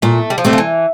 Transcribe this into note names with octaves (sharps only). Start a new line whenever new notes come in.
A#2 A3
G3
F3
G3 A3 C4
F3
E3